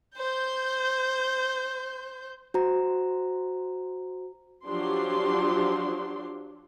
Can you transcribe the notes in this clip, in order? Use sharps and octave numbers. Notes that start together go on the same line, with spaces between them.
C5 G6
F#4 C5 A#5
F3 F#3 D4 G4 C6